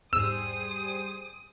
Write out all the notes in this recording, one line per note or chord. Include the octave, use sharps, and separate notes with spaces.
E2 G#2 G3 G#4 C5 D#6 E6